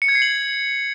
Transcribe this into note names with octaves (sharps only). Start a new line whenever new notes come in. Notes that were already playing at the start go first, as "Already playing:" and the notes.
C#7
G#6
C7
F#7